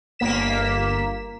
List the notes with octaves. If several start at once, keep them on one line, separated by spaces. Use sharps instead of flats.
G1 A#3 B6 E7